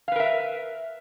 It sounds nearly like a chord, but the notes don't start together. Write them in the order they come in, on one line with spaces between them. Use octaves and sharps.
F5 B4 A#4 E5